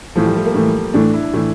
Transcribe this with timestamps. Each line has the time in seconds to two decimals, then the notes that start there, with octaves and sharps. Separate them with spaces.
0.16 A2 E3 F3 A3
0.25 G3
0.36 A3
0.45 A#3
0.55 A2 E3 A3
0.94 A2 E3 A3 D4
1.14 E4
1.33 A2 E3 A3